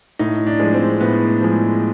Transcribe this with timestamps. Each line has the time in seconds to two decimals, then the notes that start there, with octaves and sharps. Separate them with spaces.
0.19 A2 D#4
0.47 D4
0.60 F3 G#3
0.74 C4
1.00 A2 B3
1.41 F3 G#3